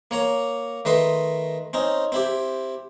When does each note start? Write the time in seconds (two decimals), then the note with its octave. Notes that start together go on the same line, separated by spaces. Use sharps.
0.11 A#3 C#5 A#5
0.85 D#3 A3 B4 D#5 C6
1.73 C4 C#4 D#4
2.12 C4 E4 G4